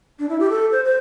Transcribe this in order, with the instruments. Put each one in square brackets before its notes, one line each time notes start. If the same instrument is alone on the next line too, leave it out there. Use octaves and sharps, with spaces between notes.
[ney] D4
E4
G4
A4
C5
C5